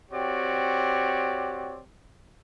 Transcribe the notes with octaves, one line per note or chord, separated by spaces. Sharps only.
C4 F#4 G4 C#5 D5